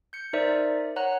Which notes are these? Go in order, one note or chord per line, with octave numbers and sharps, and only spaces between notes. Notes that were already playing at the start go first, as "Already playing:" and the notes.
G6 C#7
D#4 A#4 C5 D5 E5
C#5 F#5 A#5 F#6